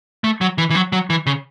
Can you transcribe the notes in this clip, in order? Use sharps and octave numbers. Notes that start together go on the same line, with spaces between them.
A3
F#3
E3
E3
F#3
F#3
E3
C#3